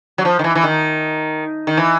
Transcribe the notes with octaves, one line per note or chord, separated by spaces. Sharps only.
F#3
F3
D#3
E3
E3
D#3
D#3
E3